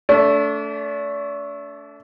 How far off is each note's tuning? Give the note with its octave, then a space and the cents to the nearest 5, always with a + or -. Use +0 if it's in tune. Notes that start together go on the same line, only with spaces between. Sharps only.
A3 +0 D4 -40